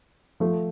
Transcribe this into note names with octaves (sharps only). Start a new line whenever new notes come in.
F3 A3